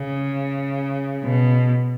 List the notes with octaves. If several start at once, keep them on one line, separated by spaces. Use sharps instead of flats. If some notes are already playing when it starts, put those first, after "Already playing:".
Already playing: C#3
B2